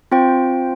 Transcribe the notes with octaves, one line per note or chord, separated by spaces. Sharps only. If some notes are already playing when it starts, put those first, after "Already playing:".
C4 F4 C5 G5